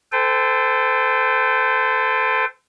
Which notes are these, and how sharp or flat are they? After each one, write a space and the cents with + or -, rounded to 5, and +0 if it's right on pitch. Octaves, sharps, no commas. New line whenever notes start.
A4 +0 C5 -30 G5 +30